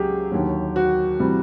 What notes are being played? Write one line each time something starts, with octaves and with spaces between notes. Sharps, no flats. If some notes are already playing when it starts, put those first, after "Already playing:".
Already playing: C#2 C#3 F#3 G4 G#4
D#2 D3 F#3
F#4
C3 E3 G3